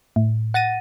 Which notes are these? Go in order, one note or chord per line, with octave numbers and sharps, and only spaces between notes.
A2
F#5 A6 A#6 D#7